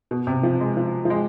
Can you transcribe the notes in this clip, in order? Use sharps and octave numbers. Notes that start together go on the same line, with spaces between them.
B2
C3
F3
G#3
F3
F3
G#3